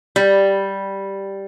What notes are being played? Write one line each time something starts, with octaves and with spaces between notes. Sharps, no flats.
G3